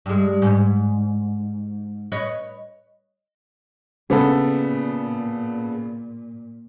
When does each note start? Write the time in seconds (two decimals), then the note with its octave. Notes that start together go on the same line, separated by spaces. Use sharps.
0.06 G2 G#3
0.42 G#2
2.12 B4 C#5 D#5
4.10 A#2 C#3 B3 A4